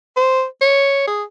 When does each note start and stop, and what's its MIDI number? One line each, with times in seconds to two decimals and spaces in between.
0.17 0.44 72
0.61 1.03 73
1.07 1.23 68